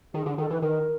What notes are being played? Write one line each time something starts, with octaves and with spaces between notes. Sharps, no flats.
D#3 G#4
D3
D#3 A4
E3 B4
D#3 A#4